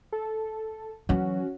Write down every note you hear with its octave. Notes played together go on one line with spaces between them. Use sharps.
A4
E3 F#3 C#4 F#4